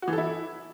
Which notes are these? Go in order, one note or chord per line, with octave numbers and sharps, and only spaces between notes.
F#4
E3
A4
E4